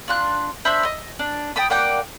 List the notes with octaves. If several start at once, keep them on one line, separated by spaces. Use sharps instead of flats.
D4 F4 F#6
D4 C5 E5 B5
D#5
D4
G5 A5 B5 D#6
A#3 D5 F#5 G5